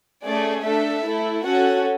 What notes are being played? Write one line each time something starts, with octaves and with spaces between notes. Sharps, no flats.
A3 C#4 G#4 D5
A3 D4 A4 E5
A3 E4 A4
C#4 F#4 A4 F#5